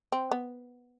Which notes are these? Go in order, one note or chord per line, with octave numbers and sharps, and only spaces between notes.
C4
B3